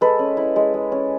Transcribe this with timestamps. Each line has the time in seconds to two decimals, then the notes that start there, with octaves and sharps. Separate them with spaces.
0.01 G#3 A4 B4
0.19 C#4
0.37 E4
0.56 G#3
0.74 G#3
0.92 C#4